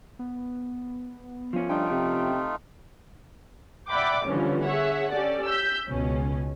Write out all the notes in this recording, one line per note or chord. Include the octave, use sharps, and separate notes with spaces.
B3
F3 C#4
G2 A3 D#4 F4 G5
C3
D5 E5 F#5 G5 B5 D6
G1 D3 E3 F3 C#4
G#4 C#5 E5 F#5
C#4 G4 A4 D5
E6 G6 B6
C#2 B2 C#4